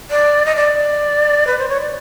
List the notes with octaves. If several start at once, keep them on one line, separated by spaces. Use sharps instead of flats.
D5
D#5
D5
B4
C5
C#5
D5